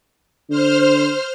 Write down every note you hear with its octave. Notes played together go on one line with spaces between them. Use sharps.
D3 C5 F6